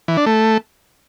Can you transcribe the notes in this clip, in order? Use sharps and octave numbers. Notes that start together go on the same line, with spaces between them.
E3
D4
A3